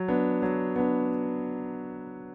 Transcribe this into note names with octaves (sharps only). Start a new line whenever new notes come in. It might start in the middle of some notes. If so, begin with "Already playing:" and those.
Already playing: F#3
B3 D4
F#3
B3 D4